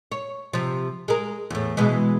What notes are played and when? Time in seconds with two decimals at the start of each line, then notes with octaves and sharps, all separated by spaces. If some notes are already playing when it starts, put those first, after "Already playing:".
0.12 C#5
0.53 C3 F3
1.08 G#3 A#4
1.50 E2 A2
1.77 B2 E3 G#3